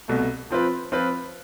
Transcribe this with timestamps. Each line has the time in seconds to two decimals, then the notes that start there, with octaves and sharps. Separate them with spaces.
0.08 C2 B2 A3
0.50 F3 C4 F4 B4
0.92 F3 C4 F4 B4